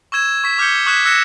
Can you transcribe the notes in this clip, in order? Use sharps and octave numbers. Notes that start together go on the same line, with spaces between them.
C#6 E6 G#6 E7
C#6 B6
D6 F6 G6 G#6 C#7 G7
C#6 D#6 F#6 G#6 B6 E7
E6 F#6 A#6 C#7 E7